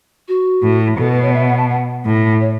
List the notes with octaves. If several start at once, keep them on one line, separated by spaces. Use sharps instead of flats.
F#4
A2
B2 A4
B4
C#5
E5
F#5
A5
F#5
A2
C#5